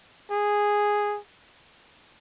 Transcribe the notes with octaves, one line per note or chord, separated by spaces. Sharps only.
G#4